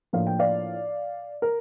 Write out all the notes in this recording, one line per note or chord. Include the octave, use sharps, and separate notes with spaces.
A2 F3 A#3 D4 F5
G5
D5 F5
A#4